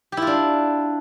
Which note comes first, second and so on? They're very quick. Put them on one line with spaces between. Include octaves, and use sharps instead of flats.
G4 E4 F4 D4